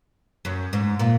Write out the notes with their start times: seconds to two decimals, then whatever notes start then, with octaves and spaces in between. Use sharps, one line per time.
0.45 F#2
0.73 G#2
0.99 A#2